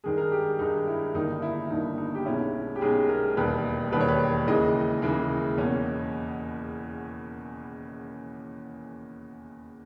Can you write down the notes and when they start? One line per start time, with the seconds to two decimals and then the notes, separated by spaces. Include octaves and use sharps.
0.04 G2 D#3 G#3 G#4
0.18 A#4
0.25 G#4
0.32 G4
0.59 G2 D#3 G#3 D#4
0.88 E4
1.14 G1 G2 D#3 A#3 D#4
1.42 E4
1.70 G1 G2 D#3 A#3 D#4
1.98 D#4
2.15 G4
2.26 B1 B2 G#3 C#4 E4
2.76 G4
2.81 B1 B2 G#3 C#4 G#4
3.09 A#4
3.37 E1 D#2 D#3 G3 B4
3.92 E1 D#2 D#3 G3 B4
4.01 C#5
4.08 B4
4.47 D#2 C#3 E3 G#3 D#5
5.02 D#2 C#3 E3 G#3
5.58 E2 B2 A#3 C#4